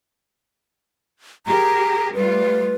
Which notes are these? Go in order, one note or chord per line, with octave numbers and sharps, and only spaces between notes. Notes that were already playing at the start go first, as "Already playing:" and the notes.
G4 G#4 A#4 A#5
G3 A3 F4 B4